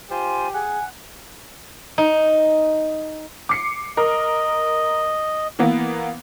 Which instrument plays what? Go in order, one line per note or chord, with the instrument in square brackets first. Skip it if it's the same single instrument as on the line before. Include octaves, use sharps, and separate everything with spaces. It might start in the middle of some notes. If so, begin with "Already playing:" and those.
[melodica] F4 C5 [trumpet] G4 [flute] G#5
[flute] G#4 [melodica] F#5 [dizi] G#5
[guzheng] D#4
[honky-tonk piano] D6 C7 C#7
[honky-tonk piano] A#4 [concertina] D#5
[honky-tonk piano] E3 A#3 B3